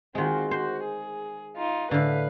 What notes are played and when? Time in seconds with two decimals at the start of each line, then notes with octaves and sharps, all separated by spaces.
0.15 D#3 G#3 C4 F4 F#4
0.51 F#4 C5
0.84 G#4
1.56 D#4 F4
1.91 A2 D3 B4 F5